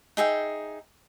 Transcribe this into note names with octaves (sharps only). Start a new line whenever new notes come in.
D#4 G#4 E5 G5